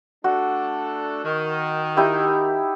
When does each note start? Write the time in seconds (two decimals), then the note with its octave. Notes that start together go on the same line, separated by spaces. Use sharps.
0.24 A3 D4 F#4 A4
1.24 D#3
1.97 D#4 E4 G4